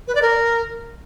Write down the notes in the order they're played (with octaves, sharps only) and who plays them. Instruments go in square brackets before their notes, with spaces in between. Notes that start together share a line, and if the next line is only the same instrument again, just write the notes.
[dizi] B4
D5
A#4